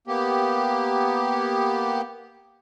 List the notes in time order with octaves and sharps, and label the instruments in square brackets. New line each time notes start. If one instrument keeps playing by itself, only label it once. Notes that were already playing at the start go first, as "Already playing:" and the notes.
[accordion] A#3 B3 G4